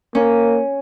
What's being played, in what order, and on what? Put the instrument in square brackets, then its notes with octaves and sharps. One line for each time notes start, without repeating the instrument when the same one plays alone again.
[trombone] A#3 [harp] C#4